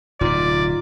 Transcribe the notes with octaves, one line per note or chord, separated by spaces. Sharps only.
D1 B2 D#4 F4 D5